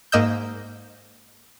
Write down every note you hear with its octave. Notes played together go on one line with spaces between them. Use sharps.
G#2 A#3 D#5 E6 G6